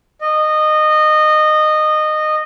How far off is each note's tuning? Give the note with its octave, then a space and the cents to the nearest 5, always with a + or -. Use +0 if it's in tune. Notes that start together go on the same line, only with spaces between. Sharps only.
D#5 -20